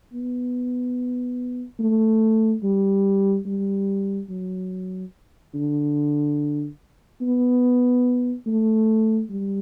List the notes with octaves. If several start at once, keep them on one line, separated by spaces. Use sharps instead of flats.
B3
A3
G3
G3
F#3
D3
B3
A3
G3